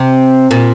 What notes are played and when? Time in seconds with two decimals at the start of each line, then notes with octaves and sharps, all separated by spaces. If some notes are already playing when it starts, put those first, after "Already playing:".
Already playing: C3
0.51 A#2